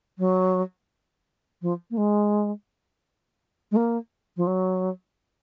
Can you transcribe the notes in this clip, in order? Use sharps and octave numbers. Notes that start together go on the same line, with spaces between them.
F#3
F3
A#3
G#3
G#3
A#3
F3
F#3